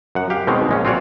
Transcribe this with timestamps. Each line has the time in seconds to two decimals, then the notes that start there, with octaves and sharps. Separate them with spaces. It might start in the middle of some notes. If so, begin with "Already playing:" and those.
0.15 F#2 F#5
0.30 G4 F5
0.47 B2 D#3 G#3 C4 C#4
0.69 A#1 G#3 C#4
0.85 C4 F4 F#4 C#5 D5